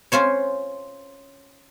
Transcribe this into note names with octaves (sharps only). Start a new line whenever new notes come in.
C#4 F4 C5 C#5